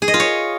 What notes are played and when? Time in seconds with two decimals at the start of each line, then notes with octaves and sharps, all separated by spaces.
0.02 G#4
0.08 D#5
0.14 F4
0.20 C#5